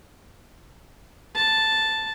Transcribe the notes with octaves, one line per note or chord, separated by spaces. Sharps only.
A5